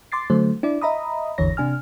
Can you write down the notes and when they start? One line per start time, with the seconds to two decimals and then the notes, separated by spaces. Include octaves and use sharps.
0.12 C6 D6 A6 C7
0.30 D3 F#3 A3 C5
0.63 D4 E4 D5
0.82 D#5 E5 A#5 B5 D#6
1.38 G#1 E2 D3 E3 C#5 A#6
1.57 C3 D4 G#5 F6